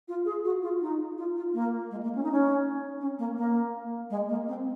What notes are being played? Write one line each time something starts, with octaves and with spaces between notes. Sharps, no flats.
F4
G#4
F#4
F4
D#4
F4
F4
A#3
G#3
A#3
C#4
D#4
C#4
C#4
A#3
A#3
G#3
A#3
C4